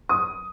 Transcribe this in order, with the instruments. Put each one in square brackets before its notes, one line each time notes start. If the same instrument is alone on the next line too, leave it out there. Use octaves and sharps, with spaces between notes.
[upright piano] D#6